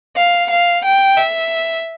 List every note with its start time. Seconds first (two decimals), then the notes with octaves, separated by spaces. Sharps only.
0.16 F5
0.50 F5
0.84 G5
1.17 E5